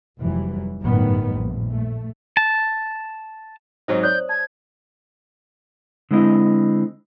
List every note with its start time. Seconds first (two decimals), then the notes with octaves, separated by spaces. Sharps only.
0.19 F1 E3 F#3 G3
0.81 G1 F#2 A2 D#3 G3 B3
1.33 A#1
1.72 A3
2.37 A5
3.88 G#2 F#3 D#4 C5
4.03 C#5 D5 D#6 F#6 G6
4.29 A5 G#6
6.11 D3 G#3 C4 E4 D#5